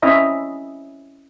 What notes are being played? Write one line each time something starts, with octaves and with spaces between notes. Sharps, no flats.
C4 C#4 E4 D#5 E5 A#5